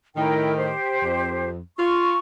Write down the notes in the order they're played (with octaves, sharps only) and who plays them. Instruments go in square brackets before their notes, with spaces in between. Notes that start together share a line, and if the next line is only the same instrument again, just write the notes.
[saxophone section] A2 D#3 [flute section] E4 A#4 G5
[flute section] G4 C5
[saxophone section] F2
[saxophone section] F4 [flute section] C#6